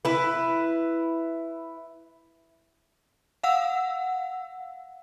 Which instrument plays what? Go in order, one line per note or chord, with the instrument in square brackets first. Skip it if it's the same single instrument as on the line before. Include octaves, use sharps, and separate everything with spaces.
[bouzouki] E4 B4
[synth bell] F5 F#5 E6